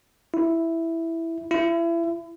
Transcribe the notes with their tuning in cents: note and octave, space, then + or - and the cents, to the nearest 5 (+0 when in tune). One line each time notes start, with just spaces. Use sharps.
E4 +0
E4 +30